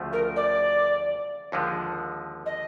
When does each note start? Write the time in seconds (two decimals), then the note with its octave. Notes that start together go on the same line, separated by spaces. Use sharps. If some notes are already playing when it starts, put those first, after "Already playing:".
Already playing: D2 C#3 F3 A3
0.13 A#4
0.36 D5
1.52 D#2 D3 F3 G#3
2.46 D#5